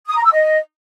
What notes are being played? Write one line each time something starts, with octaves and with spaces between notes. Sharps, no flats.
D#6
A#5
E6
D#5